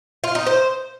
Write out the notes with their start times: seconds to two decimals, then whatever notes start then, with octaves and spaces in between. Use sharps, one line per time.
0.24 F4
0.35 D#4
0.47 C5